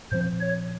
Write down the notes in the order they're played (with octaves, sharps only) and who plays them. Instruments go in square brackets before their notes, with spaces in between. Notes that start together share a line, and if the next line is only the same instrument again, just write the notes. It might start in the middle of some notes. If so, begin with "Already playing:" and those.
[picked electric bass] A#2 F3 C4 [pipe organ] C5
[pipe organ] C#5